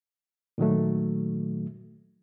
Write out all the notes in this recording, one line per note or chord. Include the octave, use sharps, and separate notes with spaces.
A#2 D#3 F#3 A3